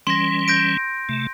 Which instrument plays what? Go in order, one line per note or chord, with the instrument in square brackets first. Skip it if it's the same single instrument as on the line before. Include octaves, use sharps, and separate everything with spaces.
[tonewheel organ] E3 G3 C#4 [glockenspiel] C6 A#6
[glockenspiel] G6 A#6 D7
[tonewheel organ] C3 A3